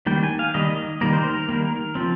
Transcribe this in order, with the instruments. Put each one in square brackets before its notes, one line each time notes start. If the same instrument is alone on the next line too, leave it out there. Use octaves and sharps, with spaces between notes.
[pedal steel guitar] D#3 G3 A#3 G5
G#5
F5
D#3 G3 A#3 D#5
D#5
D#3 G3 A#3 A#4
C5
A#4
D#3 G3 A#3
F3 C4